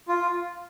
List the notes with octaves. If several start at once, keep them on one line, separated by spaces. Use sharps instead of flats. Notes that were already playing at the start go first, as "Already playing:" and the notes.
F4